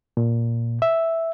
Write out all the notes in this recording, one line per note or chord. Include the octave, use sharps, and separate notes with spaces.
A#2
E5